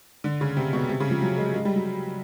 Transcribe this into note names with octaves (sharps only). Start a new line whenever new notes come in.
D3
C#3
C3
B2
C3
C#3
F3
F#3
G#3
G#3
G3
F#3